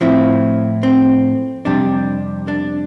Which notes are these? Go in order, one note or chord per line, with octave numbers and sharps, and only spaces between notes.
A2 F3 C4 E4
C4
F2 C3 G3 D4
D4